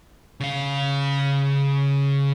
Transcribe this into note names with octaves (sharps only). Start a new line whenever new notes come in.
C#3 F5